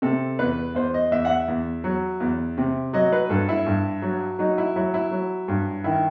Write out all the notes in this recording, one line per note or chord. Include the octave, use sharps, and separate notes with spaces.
C3 A4
E2 B4
E2 C5
D#5
E2 E5
F#5
E5
E2
F#3
E2
C3
F#3 D#5
B4
G2 A4
E4
G2
F#3
F#3 D#4
E4
F#3 E4
E4
F#3
G2
D#3 E4